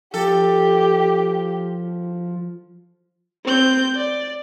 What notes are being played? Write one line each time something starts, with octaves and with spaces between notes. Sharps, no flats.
F3 G4 A4
C4 G6
D5